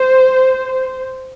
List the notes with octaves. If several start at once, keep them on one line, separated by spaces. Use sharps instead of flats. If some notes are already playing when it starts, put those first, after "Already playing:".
Already playing: C5